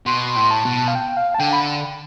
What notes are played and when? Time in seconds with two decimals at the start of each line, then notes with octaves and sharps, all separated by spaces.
0.06 B2 C6
0.36 A2
0.51 A5
0.65 B2
0.88 F5
0.95 G5
1.17 F5
1.34 A5
1.39 D3 G5
1.53 B5